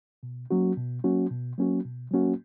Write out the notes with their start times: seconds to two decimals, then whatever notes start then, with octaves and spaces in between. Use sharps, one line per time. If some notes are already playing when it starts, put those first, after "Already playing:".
0.23 B2
0.51 F#3 A#3 C#4 F#4
0.77 B2
1.04 F#3 A#3 C#4 F#4
1.30 B2
1.58 F#3 A#3 C#4 F#4
1.85 B2
2.11 F#3 A#3 C#4 F#4